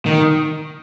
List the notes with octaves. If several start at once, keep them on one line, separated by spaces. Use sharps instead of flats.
D#3